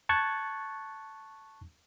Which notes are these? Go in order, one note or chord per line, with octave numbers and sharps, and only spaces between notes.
A5 C#6 F#6 G#6 A6